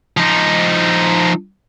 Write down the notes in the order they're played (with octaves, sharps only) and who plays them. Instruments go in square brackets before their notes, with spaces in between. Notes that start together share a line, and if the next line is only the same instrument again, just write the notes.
[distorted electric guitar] F3 D#4